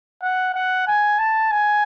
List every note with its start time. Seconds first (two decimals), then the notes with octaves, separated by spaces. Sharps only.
0.22 F#5
0.55 F#5
0.87 G#5
1.19 A5
1.51 G#5